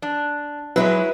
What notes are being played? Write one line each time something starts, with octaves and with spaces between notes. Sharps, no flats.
D4
F#3 G#3 E4 B4